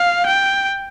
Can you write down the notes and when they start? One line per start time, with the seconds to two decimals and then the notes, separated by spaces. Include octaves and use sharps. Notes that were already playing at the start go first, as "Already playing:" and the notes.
Already playing: F5
0.26 G5